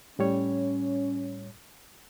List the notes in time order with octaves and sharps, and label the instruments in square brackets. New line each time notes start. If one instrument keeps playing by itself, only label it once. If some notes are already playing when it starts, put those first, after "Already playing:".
[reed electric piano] A2 G3 C#5 [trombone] C#4